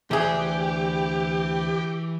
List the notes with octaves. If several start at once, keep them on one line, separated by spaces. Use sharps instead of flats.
D2 E3 G4 G#4